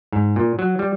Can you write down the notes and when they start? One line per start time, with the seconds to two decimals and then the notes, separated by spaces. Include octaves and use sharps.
0.12 G#2
0.36 A#2
0.59 F#3
0.79 G3